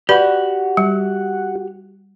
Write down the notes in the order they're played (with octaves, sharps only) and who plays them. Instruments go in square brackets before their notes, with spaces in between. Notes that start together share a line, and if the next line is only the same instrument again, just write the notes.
[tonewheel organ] F#4 [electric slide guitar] G4 F#5 [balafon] B4 D5 B5
[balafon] G3